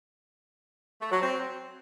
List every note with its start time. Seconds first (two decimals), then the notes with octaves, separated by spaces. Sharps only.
1.02 A3
1.12 F#3
1.22 C4